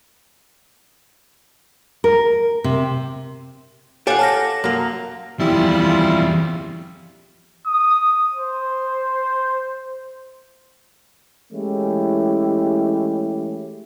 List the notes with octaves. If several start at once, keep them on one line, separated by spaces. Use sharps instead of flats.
A#4
C3
G4 A4 C#5 F5 F#5 G#5
A5 F6 A#6
F#2 A#3
E2 F3 G3 E4 F4
D#6
C5
E3 G#3 A3 C#4 E4 G4